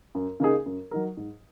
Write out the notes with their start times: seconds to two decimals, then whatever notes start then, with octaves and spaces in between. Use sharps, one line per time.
0.15 F#2
0.40 C#3 A#3 D#4 G#4
0.66 F#2
0.91 F#3 D#4 A#4
1.17 G#2